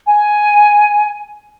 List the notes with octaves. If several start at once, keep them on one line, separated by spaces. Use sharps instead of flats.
G#5